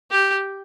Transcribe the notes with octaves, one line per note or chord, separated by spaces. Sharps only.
G4